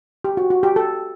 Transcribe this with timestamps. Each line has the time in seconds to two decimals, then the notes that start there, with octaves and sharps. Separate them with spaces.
0.24 G4
0.37 F#4
0.50 F#4
0.63 G4
0.76 A4